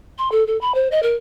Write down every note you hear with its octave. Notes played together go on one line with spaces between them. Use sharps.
C6
A4
A4
B5
C5
D#5
A#4